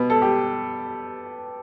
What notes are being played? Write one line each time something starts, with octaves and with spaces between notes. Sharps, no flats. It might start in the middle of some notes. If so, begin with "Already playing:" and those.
Already playing: B2 B4
A4
G4